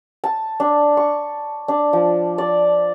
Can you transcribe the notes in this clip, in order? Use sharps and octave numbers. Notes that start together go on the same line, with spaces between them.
A5
D4
C#6
D4
F3
D5